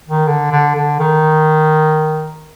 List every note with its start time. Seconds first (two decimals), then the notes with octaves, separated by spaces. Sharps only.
0.09 D#3
0.27 D3
0.51 D3
0.75 D3
0.99 D#3